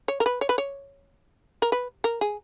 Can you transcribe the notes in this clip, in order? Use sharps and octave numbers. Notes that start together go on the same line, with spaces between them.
C#5
A#4
B4
C#5
B4
C#5
A#4
B4
A#4
G#4